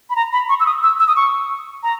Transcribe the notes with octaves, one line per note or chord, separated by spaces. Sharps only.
B5
A#5
B5
C#6
E6
D#6
E6
E6
D#6
C#6
A#5